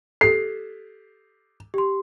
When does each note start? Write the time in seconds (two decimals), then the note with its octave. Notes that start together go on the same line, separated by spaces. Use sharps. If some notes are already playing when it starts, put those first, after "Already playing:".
0.21 G4 A4 C7
1.74 G4 C6